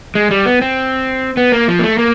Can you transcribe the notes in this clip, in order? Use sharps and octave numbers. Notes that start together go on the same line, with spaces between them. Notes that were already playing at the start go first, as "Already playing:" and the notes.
G#3
G3
B3
C4
B3
A#3
F3
A#3
A3
A#3